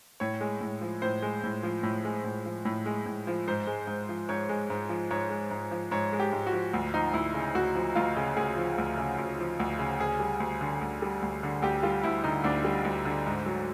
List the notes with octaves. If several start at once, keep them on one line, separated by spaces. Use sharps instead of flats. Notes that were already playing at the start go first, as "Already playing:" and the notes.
A2 C#5
G#3
A2
F3
A2 C5
G#3
A2
F3
A2
G#3
A2
F3
A2
G#3
A2
F3
G#2 C5
G#3
G#2
F3
G#2 C#5
G#3
G#2
F3
G#2 C#5
G#3
G#2
F3
G#2 C#5
G#3
G4
G#2
F#4
F3
D2
F3 D#4
D2 E4
C#3
D2 F#4
F3
D2 F4
C#3
D2 G#4
F3
D2
C#3
D2
F3
D2
C#3
D2 G#4
G3
D2
D3
D2
G3
D2
D3
D2 G4
G3 F4
D2 E4
D3 D#4
D2 D4
G3
D2
D3
G#2
F#3